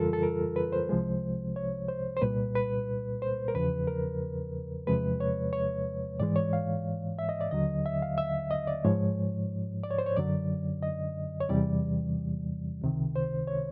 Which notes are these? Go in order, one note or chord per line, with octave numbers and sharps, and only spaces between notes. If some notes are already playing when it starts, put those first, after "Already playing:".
Already playing: F2 C#3 E3 G3 F4 A4 A#4
A4
A#4
B4
C5
C2 C3 F3 G#3
C#5
C5
C5
C2 A#2 G3 B4
B4
C5
A#4
E2 C#3 F3 B4
A#4
E2 C3 F3 G#3 B4
C#5
C#5
G#2 E3 G#3 D5
C#5
F5
E5
D#5
D5
D#2 D3 F#3 D#5
E5
F5
E5
D#5
D5
G#2 F3 G#3 C#5
D5
C#5
C5
C#5
F#2 D3 F#3 D5
D#5
C#5
E2 C3 E3 G3 D5
C#2 C3 D#3
C5
C#5